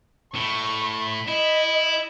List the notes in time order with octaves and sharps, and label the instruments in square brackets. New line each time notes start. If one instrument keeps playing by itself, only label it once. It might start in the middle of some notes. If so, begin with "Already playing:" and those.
[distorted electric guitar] A2 [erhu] C#6
[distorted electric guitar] E4 [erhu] D#5